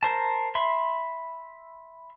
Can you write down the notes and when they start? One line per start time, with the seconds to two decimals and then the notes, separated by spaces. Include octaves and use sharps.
0.03 A#4 C5 A5
0.55 E5 B5 C6